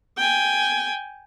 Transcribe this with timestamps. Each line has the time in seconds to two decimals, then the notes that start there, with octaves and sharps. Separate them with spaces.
0.17 G5 G#5